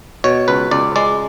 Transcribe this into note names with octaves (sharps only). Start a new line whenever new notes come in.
B2 C#5
C#2 B4
C#2 D5
G#3 D5